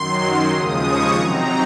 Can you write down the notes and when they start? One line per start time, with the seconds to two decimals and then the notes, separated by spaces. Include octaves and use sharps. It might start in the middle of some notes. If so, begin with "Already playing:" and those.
Already playing: F#2 D#3 F#3 C6
0.52 D#2 C#3 F3 G#3 D#6
0.83 C#6
1.15 C3 F#3 C4 D#4 A#5